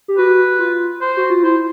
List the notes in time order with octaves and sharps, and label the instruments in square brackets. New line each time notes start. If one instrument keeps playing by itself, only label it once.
[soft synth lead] G4
[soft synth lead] F#4 [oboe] B4
[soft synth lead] F4
[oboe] C5
[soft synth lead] F#4
F4
[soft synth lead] E4 [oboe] C5